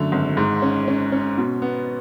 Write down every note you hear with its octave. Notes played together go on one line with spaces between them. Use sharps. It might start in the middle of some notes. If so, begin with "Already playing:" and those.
Already playing: F#2 D3 A3
G#1
G#2
C#4
C#4
C#4
B2
B3